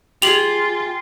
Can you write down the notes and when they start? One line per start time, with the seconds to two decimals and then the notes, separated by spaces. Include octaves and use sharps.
0.22 F4 G4 G#4 F7 F#7